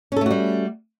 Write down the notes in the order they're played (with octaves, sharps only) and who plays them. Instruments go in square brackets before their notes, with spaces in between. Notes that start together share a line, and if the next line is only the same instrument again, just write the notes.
[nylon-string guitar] C#4
A4
A3
F#4
G3